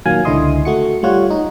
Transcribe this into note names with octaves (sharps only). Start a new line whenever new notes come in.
A#2 D#3 F#3 A#3 F5 G#5
C#2 D3 E4 D#5 C6 D#6
A3 F#4 C#7
G3 A3 F4 C#5 F#5
D#4